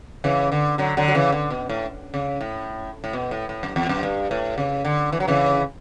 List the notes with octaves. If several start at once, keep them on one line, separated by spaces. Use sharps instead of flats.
C#3 E3
D3
D3 F#3
D3 F#3
F#3
C#3 E3
D3
B2
A2
C#3
A2
A2
B2
A2
A2
F#2
E2
F#2
G2
A2
C#3
D3
E3
F#3
C#3 E3